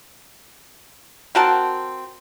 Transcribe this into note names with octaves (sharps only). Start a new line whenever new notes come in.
C4 F#4 A#4 A5